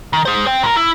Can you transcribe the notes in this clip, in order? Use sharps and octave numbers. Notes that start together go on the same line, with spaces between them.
D#3
G#4 C5
C5 G5
A#2 A#4
E4